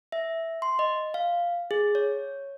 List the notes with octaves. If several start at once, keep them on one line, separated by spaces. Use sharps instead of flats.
E5
C6
D#5
F5
G#4
C#5